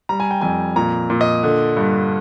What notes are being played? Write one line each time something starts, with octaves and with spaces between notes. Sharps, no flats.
G3 A#5
G#5
G5
F2 G#5
A#2 A#5
A#2
D#5
D3
G2